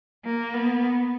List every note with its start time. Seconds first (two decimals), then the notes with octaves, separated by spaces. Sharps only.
0.25 A#3
0.54 B3